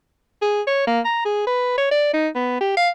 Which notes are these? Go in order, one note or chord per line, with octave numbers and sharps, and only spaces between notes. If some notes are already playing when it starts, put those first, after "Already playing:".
G#4
C#5
A#3
A#5
G#4
B4
C#5
D5
D#4
B3
G4
F5